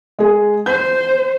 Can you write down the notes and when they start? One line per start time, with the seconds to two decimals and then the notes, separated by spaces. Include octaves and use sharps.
0.19 G#3 G#4
0.66 C5 G6